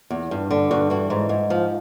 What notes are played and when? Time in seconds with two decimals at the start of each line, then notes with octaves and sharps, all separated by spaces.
0.10 E2
0.31 G2
0.51 D3
0.71 G2 F#4
0.90 E3 F#4
1.10 G#2
1.29 G#2
1.50 F3